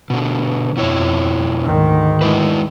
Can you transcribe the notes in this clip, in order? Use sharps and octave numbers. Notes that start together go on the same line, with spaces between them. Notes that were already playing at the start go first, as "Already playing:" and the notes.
B2 D3
F2 B2 E4 C#5
D2 G#2 D#3
G#3 E4 B4